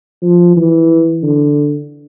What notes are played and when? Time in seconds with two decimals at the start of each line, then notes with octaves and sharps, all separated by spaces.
0.22 F3
0.57 E3
1.23 D3